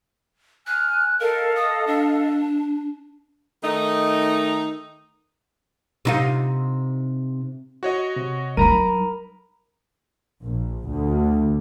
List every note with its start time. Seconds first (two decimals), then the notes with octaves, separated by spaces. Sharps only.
0.67 G#5 F6 F#6
1.20 A4 A#4 D#5 F5
1.55 D#6
1.87 D4
3.63 D#3 A3 D#4
6.05 C3 D#4 F4
7.83 F#4 C#5 D#5
8.16 C3
8.57 F#3 D#4 A#4 A#5 B5 D#7
10.44 A#1
10.87 D2